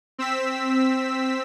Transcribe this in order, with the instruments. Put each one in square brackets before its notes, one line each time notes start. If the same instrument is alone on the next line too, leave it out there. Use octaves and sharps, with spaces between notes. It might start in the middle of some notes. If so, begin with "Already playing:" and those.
[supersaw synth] C4 E6 B6